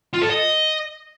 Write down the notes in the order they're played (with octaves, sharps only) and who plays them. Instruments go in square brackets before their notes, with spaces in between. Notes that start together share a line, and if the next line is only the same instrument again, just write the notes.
[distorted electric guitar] F4
A4
D#5